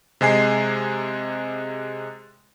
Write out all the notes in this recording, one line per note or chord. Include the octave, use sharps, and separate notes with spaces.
C3 G#3 G#5 C7